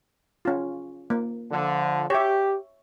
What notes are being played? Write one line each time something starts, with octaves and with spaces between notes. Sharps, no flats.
C#4 F4
A#3
D3 F3
G4 C#5 E5